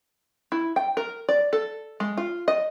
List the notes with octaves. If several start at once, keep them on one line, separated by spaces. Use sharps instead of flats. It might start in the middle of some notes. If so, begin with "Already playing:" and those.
E4
G5
A#4
D5
A4
G#3
F4
D#5